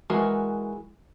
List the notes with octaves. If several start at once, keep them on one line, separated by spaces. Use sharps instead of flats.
E3 G#3 F#4 A#4